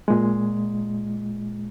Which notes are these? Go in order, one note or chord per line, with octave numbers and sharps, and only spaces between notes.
A#2 G#3